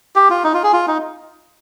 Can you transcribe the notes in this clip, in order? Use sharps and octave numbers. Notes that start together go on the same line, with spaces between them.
G4
F4
D#4
F4
G#4
F4
D#4